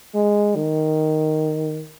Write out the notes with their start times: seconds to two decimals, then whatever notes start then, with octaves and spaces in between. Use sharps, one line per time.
0.15 G#3
0.55 D#3